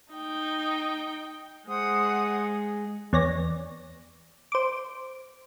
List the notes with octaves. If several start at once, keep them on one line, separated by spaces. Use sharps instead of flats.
D#4 G5
G#3 C5 F#5 D#6
E2 C#5 D5 A#6
C5 D6